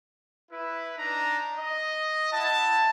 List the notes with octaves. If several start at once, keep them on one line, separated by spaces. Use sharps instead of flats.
E4 B4
D4 D#4 A#5
D#5
E4 F#5 A5